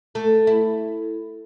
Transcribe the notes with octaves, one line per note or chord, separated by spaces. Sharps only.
A3
E4